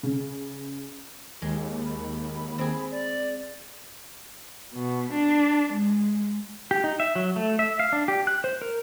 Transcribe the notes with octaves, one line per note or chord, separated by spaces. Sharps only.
C#3
D#2 G#3
B5
C4 G#4
D5
B2
D4
G#3
G4
D#4
E5
F#3
A3
E5
F5
D4
G4
F#6
C5
A#4